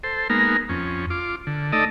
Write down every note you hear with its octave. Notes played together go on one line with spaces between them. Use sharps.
A4 C5
G#3 A#3 B3 D#4 A#4
F2 C#4
F4 D6
D3
A3 D#4 A4 D5 D#5